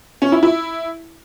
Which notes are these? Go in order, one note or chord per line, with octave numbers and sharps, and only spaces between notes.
C#4
E4
E4